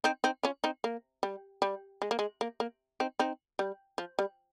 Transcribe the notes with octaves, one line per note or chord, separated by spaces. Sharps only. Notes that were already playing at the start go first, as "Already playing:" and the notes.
C4 D#4
C4 D#4
C#4 F4
C4 D#4
A#3
G3
G3
G#3
A#3
G#3
A#3
A#3
C4 D#4
C4 D#4
G3
F3
G3